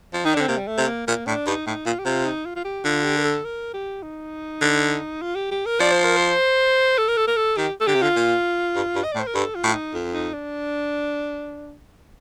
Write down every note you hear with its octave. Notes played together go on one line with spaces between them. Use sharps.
F3
D#3 D#4
D4
D3 C4
C3 A#3
G3
A3
C3
A#3
A#2 A#3
A2 D4
G2 D#4
A2 D#4
A#2 F4
G4
C3 F4
D#4
F4
F4
G4
D3 F4
G4
A#4
A4
A#4
G4
D#4
D3
F4
G4
G4
A#4
F3 D5
C5
A#4
C5
A4
A#4
A4
A#4
A4
D#3 G4
A4
D3 G4
C3
D3 F4
A#2
G2
G2
D#5
D5
A2
C5
A#4
G2 A4
F4
A2
F4
D#4
F2
D#4
D4